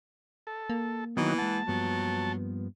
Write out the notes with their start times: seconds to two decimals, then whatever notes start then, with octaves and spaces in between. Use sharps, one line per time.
0.47 A4
0.70 A#3
1.17 D#3 E3 F#3 B3 E4
1.38 G#3 F#5 A5
1.68 G2 F3 F#3 B3